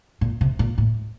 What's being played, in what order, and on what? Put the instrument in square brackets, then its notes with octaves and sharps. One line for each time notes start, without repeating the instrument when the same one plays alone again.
[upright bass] A#2
C3
A#2
A2